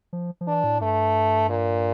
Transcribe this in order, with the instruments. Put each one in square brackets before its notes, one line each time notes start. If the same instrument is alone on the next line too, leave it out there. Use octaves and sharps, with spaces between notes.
[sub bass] F3
F3
[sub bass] E3 [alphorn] D4
[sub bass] A2
[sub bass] G2 [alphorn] A3
[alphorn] A#2